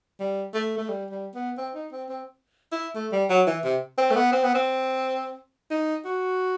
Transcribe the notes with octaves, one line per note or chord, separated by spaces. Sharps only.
G3
A3
A3
G3
G3
B3
C4
D#4
C4
C4
E4
A3
G3
F#3
E3
C3
C4
A3
B3
C4
B3
C4
D#4
F#4